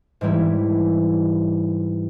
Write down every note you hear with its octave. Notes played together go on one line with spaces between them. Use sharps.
G#2 E3 G3 E4